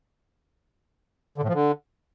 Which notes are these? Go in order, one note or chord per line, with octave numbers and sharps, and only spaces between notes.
D3
A2
F3
D3